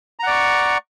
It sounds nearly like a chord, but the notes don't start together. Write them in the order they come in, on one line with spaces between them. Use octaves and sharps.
A#5 F#5 D5 C#6